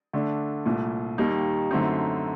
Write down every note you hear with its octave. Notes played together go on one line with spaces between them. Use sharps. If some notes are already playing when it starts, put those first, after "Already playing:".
D3 A3 D4
C2 A#2 A3
D#2 D#3 G3 A#3 D#4
F#2 D3 A3 C4 D#4